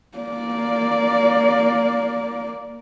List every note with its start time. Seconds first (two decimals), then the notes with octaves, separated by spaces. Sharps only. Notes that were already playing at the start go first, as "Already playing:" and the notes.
0.18 A#3 D5